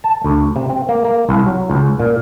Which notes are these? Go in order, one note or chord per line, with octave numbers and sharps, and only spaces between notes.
A5
D2
C3
C4
A#3
A#3
C2
F#3
C#2
A#2